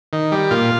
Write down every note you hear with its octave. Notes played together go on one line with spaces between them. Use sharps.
D#3
G3
A#2 F4